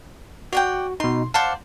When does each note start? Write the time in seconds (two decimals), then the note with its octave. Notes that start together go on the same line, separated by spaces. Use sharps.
0.53 F#4 D5 F#5 G5
1.00 B2 D#4 C6
1.34 C5 D5 F5 F#5 A5